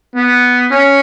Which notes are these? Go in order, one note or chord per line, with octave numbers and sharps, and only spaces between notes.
B3
C#4